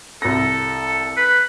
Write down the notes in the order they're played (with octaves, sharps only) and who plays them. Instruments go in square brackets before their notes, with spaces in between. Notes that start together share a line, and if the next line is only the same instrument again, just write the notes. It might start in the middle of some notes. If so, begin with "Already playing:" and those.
[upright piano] C2 A#6 [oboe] A4
[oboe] B4